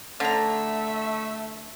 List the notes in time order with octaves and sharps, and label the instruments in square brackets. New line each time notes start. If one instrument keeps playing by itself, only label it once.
[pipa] D3 A#5 [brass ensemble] A3 [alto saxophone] E5